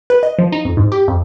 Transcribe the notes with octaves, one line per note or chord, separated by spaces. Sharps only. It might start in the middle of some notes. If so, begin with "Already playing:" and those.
B4
D#5
F3
D#4
F2
G#2
G4
F2